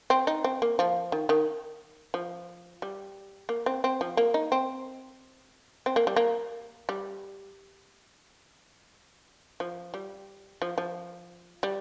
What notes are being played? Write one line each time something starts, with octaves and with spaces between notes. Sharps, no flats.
C4
D#4
C4
A#3
F3
D#3
D#3
F3
G3
A#3
C4
C4
F3
A#3
D#4
C4
C4
A#3
G3
A#3
G3
F3
G3
F3
F3
G3